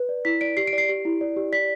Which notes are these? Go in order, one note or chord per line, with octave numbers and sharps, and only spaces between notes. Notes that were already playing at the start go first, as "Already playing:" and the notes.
Already playing: B4
D5
E4 B6
D5 D7
G4 C7
D7
D5
C7
G4
E4
D5
G4
D5 B6